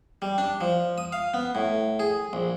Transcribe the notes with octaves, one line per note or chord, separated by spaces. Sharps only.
G3
D4
F3
D#6
F5
B3
A2
G#4
A#1